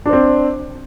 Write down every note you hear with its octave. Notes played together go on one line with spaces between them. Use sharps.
C4 D4 C5